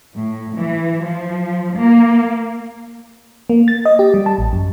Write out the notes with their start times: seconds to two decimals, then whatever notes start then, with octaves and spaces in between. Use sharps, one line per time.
0.14 A2
0.56 E3
1.04 F3
1.77 A#3
3.50 A#3
3.68 A6
3.85 D#5
3.99 G4
4.14 G3
4.26 A5
4.38 A1
4.53 F#2